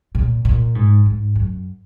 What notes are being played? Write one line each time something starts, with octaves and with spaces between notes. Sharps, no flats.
A#2
A#2
G#2
G#2
F#2